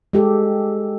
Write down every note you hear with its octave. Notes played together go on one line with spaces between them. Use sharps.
G#3 G4 A4